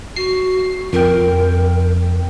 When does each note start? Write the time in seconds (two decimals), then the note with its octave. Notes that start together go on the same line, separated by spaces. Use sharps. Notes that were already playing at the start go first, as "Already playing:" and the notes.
0.16 F#4 C7
0.93 F2 A#4 G5